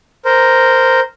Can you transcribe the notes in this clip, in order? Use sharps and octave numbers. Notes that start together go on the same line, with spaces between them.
A#4 C5